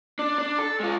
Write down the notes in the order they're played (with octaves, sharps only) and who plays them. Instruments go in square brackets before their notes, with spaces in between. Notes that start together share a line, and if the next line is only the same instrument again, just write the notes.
[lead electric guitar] D4
D4
A4
G#3 F4